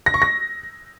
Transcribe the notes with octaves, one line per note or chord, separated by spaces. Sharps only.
A#6
C#6
A#6